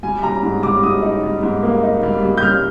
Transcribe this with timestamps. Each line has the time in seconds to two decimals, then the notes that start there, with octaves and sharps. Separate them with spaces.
0.03 G3 G#5
0.23 G3 A#5
0.43 G#2
0.63 G3 D6
0.83 G#2 D#6
1.02 D#4
1.23 G3
1.43 G#2
1.63 A#3
1.83 D#4
2.03 G3
2.23 G3
2.38 G6
2.43 G3 F6